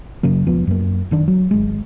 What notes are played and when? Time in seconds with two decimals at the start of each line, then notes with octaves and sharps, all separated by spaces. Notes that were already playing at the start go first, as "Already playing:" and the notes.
0.23 F#1 C#3 F#3 A#3
0.46 E1 F3 B3
0.67 F#2 A#3
1.11 F#1 D#3 D4
1.28 F#3
1.51 G#1 G#3